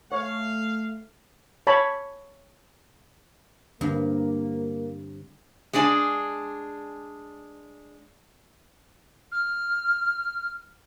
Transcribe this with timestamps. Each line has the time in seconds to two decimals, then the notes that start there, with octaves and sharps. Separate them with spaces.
0.12 A3 C#5 F5
1.67 C#5 A5 B5
3.81 G2 D3 G3 A#3 C4
5.73 G#3 D4 D5 G#5
9.32 F6